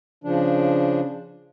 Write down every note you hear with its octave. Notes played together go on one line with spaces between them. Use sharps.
C#3 F3 D4